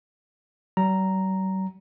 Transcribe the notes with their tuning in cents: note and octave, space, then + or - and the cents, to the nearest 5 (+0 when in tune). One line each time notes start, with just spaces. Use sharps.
G3 -45 A#5 +0